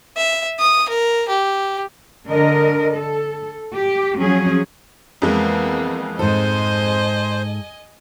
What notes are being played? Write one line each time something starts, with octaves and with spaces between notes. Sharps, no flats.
E5
D#6
A#4
G4
D3 A#4 D#5
A4
G4
F3 F#3 C#4 G#4
F2 E3 G#3 A#3 B3
G#2 A4 C5 D#5 G#5